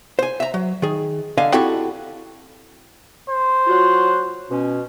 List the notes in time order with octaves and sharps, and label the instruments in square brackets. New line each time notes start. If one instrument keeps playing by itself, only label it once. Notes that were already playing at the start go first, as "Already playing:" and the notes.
[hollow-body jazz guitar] C5 G#5
E5 A#5
F#3
D#3 G#4
D3 D#5 F5 G#5
C4 E4 F#4 G4 A4
[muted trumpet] C5
[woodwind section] F#3 F4 F#4
B2 C#4